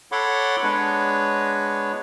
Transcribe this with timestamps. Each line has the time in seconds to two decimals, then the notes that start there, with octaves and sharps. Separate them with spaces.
0.12 A4 C#5 F#5 B5 C6 D6
0.63 G#3 B3 D4 B4 C#5